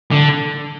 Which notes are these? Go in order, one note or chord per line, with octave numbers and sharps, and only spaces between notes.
D3